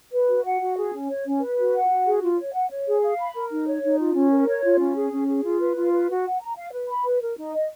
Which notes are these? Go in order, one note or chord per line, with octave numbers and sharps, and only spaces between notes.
B4
F#4
F#5
F#4
G#4
C#4
C#5
C#4
B4
F#4
F#5
F#4
G#4
F4
C#5
F#5
C#5
G#4
F5
B5
A#4
D#4
C#5
D#4
F4
C#4
A#4
C#5
F4
C#4
G#4
C#4
G#4
F4
B4
F4
B4
F#4
F#5
A#5
F5
B4
B5
B4
A#4
D#4
D#5